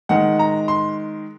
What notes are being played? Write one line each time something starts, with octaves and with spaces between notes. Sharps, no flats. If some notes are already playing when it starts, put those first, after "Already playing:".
D#3 G#3 F#5
A#5
C6